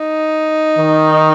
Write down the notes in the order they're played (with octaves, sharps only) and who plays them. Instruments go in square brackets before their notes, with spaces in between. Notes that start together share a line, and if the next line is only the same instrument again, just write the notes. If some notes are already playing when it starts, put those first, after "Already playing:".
Already playing: [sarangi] D#4
[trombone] D#3